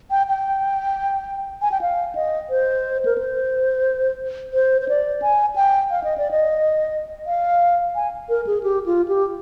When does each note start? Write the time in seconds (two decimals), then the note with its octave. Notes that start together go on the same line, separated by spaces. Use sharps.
0.11 G5
0.28 G5
1.62 G#5
1.72 G5
1.81 F5
2.15 D#5
2.50 C5
3.05 A#4
3.18 C5
4.54 C5
4.82 C5
4.89 D5
5.22 G#5
5.56 G5
5.91 F5
6.04 D#5
6.18 D5
6.31 D#5
7.27 F5
7.96 G#5
8.29 A#4
8.47 G#4
8.63 G4
8.86 F4
9.08 G4